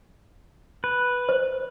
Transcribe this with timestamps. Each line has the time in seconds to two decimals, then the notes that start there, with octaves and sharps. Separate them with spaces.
0.84 B4
1.29 C5